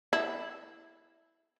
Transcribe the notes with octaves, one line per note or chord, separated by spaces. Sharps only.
E4